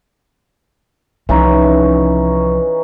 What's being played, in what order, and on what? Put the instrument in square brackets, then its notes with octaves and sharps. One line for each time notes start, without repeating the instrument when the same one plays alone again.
[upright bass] C2 F3 [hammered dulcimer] E3 C#4 D#4